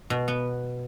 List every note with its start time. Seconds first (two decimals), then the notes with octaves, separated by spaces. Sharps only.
0.10 B2
0.28 B3